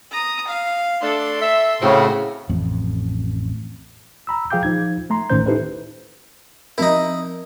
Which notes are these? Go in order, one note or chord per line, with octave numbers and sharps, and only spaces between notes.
A#5 D#6
F5
A3 D4 A4 C6
E5
A2 C#3 C4 F#4
A1 F2
A#5 B5 E6
F3 G#4 F5 G5 D6 G6
F3 D#4 G#6
A3 A#5 C6
A1 A2 D#3 C#4 C5 G6
D#4 E4 G4 A4 B4 C5
F3 C4 D#4 E4 A#4